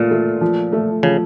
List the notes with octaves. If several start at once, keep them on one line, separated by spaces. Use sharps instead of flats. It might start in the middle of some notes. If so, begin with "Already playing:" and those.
Already playing: A#2 A3 F4
A3
F3
A3
C#3 F3